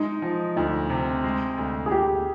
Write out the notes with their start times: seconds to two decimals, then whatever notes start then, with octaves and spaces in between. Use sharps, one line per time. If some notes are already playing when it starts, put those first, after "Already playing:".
Already playing: G#3 D#4
0.22 F3
0.56 D2 D#4
0.90 C3
1.24 G#3
1.58 D2
1.86 G#4
1.91 D2 G4